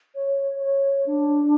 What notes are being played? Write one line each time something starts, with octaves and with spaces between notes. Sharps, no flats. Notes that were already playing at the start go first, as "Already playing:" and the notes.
C#5
C#5
D4